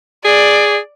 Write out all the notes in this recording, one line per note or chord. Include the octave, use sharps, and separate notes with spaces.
G#4 D5